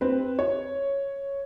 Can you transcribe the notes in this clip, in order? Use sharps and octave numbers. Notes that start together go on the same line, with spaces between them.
C4 B4
C#5